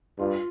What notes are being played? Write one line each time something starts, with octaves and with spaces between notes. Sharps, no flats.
G2 F4